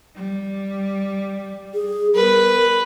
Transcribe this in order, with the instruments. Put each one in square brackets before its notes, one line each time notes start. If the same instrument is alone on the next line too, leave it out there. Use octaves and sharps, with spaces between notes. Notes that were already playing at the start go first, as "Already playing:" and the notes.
[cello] G3
[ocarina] G#4
[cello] G3 B3 [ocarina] A#4 [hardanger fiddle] B4